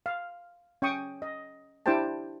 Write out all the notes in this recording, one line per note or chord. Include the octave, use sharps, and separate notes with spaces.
F5
C#4 G5 C#6 D#6
D#5
D4 E4 G4 C5 G5 A5